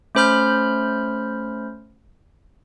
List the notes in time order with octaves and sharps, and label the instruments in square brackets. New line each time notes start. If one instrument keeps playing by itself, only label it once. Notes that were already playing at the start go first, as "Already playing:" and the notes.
[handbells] A3 C#4 C5 B5 F6 G6